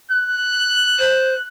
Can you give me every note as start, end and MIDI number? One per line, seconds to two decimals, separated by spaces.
0.12 1.47 90
0.99 1.34 72